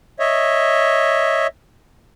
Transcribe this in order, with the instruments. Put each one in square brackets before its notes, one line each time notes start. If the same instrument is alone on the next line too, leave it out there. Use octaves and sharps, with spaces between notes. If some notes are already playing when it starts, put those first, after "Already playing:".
[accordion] C#5 D#5 E5